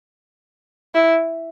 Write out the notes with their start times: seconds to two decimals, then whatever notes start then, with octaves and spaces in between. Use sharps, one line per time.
0.94 E4